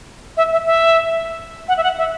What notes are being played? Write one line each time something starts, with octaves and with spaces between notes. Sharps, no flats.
E5
E5
E5
F#5
E5
F#5
E5